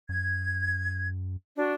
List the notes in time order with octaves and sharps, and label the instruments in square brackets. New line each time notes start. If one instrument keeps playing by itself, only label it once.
[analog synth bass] F#2 [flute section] G#6
[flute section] D4 F#4